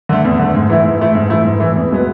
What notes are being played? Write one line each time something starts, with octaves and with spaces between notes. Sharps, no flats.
D3 A3
E2
D3 A3
G#2
E3 A3 E4
G#2
E3 A3 E4
G#2
E3 A3 E4
G#2
E3 A3 E4
E2
B2 G#3 B3